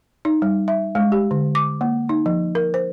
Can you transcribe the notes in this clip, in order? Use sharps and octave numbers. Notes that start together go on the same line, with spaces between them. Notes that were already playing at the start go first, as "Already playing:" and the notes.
D#4
G3
E5
G#3
G4
D3
D6
A#3
D#4
F3
A#4
C5